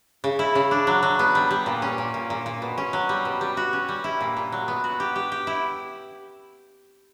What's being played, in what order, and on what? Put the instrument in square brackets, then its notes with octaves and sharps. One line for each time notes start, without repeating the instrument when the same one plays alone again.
[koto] C#3
E4
C#3
D4
F#3
F#3
B3
G3
G3
A#2
C#4
A#2
A#2
A#2
A#2
B2
C#4
F#3
G3
B2
G3
F#4
C#4
G3
E4
A#2
A#2
F#3
B3
F#4
G4
G4
G4
E4